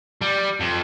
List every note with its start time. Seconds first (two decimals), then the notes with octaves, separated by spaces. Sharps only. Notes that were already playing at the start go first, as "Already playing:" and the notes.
0.21 G3
0.60 F2